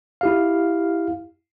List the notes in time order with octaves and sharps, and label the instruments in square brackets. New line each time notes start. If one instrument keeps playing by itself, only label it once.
[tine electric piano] E4 G4 F5